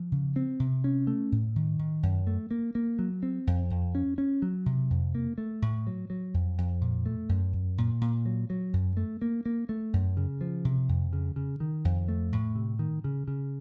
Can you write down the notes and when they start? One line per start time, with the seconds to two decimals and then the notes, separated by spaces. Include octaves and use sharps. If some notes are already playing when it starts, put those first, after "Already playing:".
Already playing: F3
0.12 C#3
0.36 C4
0.60 C3
0.84 C#4
1.07 A3
1.32 A2
1.56 D#3
1.79 D#3
2.03 F#2
2.27 A3
2.51 A#3
2.75 A#3
2.99 F#3
3.23 C4
3.47 F2
3.70 F2
3.95 C#4
4.18 C#4
4.42 F#3
4.66 C3
4.90 F2
5.15 A#3
5.38 A3
5.62 A2
5.87 F#3
6.10 F#3
6.34 F2
6.58 F2
6.81 A#2
7.06 A3
7.29 F#2
7.53 F#2
7.78 A#2
8.01 A#2
8.26 F#3
8.50 F#3
8.73 F#2
8.97 A3
9.22 A#3
9.46 A#3
9.69 A3
9.93 F#2
10.17 C#3
10.41 F3
10.65 C3
10.89 F2
11.13 C#3
11.36 C#3
11.60 D#3
11.85 F2
12.08 A3
12.32 A2
12.55 C3
12.79 D#3
13.04 C#3
13.28 C#3